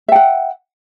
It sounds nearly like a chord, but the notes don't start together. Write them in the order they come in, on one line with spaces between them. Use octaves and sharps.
E5 G5 F#5